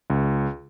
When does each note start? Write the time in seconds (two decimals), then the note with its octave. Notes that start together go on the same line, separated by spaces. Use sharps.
0.10 C#2